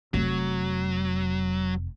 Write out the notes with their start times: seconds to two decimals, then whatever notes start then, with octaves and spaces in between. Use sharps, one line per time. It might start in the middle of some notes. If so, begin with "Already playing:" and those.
0.14 F1 F#3